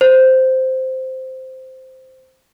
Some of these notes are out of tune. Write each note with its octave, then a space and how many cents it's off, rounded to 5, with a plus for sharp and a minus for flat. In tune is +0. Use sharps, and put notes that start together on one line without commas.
C5 -5